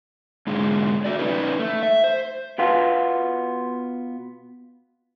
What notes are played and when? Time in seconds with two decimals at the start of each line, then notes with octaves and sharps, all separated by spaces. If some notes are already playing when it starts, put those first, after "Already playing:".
0.47 G#2 D3 G#3
1.05 A3 F#4 D5
1.19 C#4 D#4 B4 D5
1.59 A3
1.83 E5
2.04 C5
2.58 B2 B3 F4